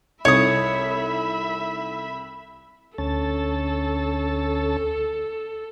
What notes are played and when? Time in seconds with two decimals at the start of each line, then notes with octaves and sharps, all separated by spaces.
0.25 C2 D#4 E4 A4 C#5 E5 B5 D#6
2.98 D2 C#4 A4 A5